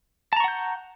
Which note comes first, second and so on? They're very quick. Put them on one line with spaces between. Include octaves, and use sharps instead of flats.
A5 A#5 C#6 F#5 G6